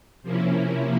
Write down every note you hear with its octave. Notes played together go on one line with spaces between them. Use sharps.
C3 F3 A#3 C#4 E4